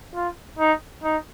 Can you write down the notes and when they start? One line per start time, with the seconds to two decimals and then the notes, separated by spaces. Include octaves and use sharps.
0.15 F4
0.59 D#4
1.04 D#4